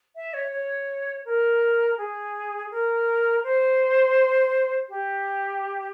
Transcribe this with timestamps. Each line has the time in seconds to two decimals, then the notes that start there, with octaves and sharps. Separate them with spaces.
0.15 E5
0.33 C#5
0.51 C#5
1.25 A#4
1.97 G#4
2.71 A#4
3.43 C5
4.89 G4